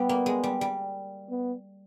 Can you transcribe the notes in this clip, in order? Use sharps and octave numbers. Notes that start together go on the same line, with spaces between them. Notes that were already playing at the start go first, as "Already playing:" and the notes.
Already playing: G3 B3
A#3
G#3
G3
G3
B3